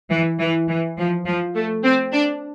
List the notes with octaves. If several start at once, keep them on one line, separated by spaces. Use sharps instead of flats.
E3
E3
E3
F3
F3
A3
C4
D4